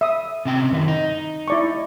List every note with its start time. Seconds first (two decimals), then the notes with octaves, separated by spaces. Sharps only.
0.01 E5 D#6
0.45 C3 C#4 G5
0.71 F#2 D#3 E4
0.88 D#4
1.48 E4 D5 C#6